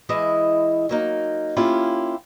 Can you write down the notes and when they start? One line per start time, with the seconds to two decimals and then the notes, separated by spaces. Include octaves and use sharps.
0.09 E3 G#3 E4 D#5
0.89 F#3 A#3 D#4
1.57 A#3 C#4 E4 F4 G4